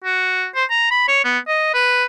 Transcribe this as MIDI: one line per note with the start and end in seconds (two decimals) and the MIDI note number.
0.04 0.46 66
0.55 0.64 72
0.70 0.88 82
0.91 1.07 83
1.08 1.21 73
1.24 1.39 59
1.48 1.70 75
1.74 2.04 71